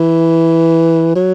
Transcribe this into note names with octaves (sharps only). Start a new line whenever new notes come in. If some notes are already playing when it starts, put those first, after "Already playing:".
Already playing: E3
F#3